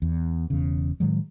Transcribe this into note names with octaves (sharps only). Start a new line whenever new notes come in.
E2
E1 E2 C#3
A2 D#3 F#3 G#3